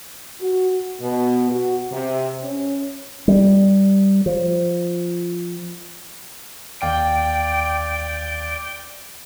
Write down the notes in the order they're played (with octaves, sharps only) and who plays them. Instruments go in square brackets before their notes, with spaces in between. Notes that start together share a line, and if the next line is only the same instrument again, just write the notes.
[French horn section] F#4
B2
F#4
C3
C#4
[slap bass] G3
F3
[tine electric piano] D#2 F5 [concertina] D5 [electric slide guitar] G5